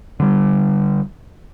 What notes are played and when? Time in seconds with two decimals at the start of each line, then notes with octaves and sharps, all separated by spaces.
0.20 D3 G3